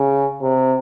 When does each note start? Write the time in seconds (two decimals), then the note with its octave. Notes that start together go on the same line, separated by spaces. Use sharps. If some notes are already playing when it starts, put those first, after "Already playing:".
Already playing: C#3
0.42 C3